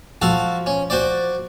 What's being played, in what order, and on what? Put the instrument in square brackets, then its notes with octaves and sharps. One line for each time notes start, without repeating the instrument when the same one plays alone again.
[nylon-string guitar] F3 [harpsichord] F#4 A4 F5
[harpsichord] C#4
F#4 C5 D5